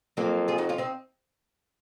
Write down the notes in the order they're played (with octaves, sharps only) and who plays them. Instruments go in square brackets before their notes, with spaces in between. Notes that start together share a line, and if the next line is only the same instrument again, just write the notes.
[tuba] F2 [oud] F#3 A#3
[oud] F4 G#4
D#4 F#4
C#4 F4
C4 D#4